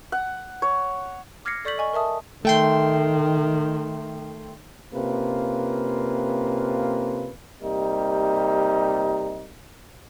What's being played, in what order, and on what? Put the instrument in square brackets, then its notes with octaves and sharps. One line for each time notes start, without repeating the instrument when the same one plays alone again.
[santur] F#5
C#5
[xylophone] D6 F6 G#6 A#6 C7 C#7
A4 D5 C#6 G6 B6 F#7
D#5 G#5 C#6
A#4 E5 A5 D#6
[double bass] D#3 [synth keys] A3 G5 C6
[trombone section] C3 A#3 C#4 F4 B4
C3 G3 A#3 D#4